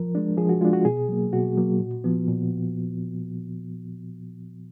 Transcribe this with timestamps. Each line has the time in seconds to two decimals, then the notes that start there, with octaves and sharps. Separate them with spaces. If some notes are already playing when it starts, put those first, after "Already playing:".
Already playing: F3 A#4
0.15 G#3 D4
0.37 F3 G#4
0.49 F#4
0.61 G#3 D4 F4
0.73 F#4
0.85 B2 G#4
1.09 F#3 A#3
1.33 B2 F#4
1.57 F#3 A#3
1.80 A#2
2.04 F3 B3
2.28 A#2